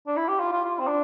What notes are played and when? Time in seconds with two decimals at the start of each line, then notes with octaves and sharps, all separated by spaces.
0.07 D4
0.17 E4
0.29 G4
0.40 F4
0.52 F4
0.65 F4
0.79 C4
0.87 D4